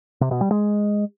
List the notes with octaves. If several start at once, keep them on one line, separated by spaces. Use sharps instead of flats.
C3
B2
G3
G#3